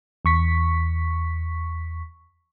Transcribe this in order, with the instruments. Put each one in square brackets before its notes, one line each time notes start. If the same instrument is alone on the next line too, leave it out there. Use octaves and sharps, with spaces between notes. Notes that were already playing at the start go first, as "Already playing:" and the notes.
[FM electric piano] E2 C#6 B6